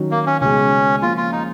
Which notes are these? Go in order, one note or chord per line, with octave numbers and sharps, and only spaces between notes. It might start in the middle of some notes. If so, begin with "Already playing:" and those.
Already playing: D#3 F#3 C#4
A#3
C#4
C#2 B2 G#3 C#4
C#3 F3 A#3 F4
F4
D#4